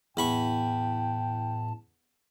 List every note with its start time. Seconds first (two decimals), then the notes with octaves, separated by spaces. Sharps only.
0.17 E2 A2 G5 A5 B5 C#6